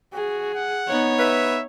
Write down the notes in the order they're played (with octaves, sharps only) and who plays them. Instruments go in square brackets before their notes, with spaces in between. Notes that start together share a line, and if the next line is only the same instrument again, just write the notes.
[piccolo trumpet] F#4 [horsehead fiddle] G#4
[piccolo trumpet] F#5
[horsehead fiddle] B3 D#4 [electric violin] C#5
[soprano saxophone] B4 [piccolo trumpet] E5